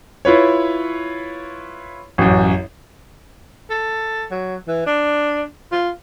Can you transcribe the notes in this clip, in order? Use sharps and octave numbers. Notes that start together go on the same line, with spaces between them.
E4 F4 B4 C#5
A1 F#2
A4
F#3
E3
D4
F4